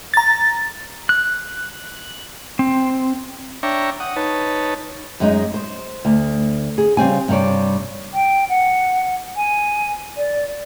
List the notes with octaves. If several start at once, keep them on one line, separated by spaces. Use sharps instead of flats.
A#5 A6
F#6
C4
D4 C#5 E5 G5 A#5 C#6
F#5 D#6
D#4 B4 C#5 A5
F#2 G#3 D#4
C5
D2
G#4
C#3 G3 C4 G#5
G2 C3 G3 C#5 D5
G5
F#5
G#5
D5